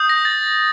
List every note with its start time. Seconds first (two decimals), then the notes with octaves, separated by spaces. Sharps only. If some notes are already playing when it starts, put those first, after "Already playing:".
Already playing: D#6 G6
0.09 A#6
0.25 A6